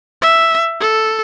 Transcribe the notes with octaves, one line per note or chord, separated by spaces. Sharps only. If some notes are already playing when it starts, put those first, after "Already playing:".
E5
A4